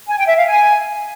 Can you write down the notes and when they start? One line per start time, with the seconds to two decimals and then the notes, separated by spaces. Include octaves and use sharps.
0.08 G#5
0.17 G5
0.27 E5
0.37 F5
0.46 G#5